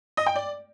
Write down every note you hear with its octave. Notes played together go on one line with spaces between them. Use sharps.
D#5
G5
D5